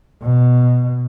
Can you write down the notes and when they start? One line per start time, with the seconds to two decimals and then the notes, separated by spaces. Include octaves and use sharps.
0.23 B2